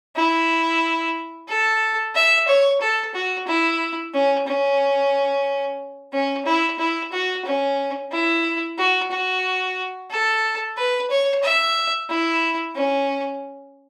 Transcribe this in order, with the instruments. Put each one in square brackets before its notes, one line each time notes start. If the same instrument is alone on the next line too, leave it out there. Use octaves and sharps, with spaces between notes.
[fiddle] E4
A4
E5
C#5
A4
F#4
E4
C#4
C#4
C#4
E4
E4
F#4
C#4
E4
F#4
F#4
A4
B4
C#5
E5
E4
C#4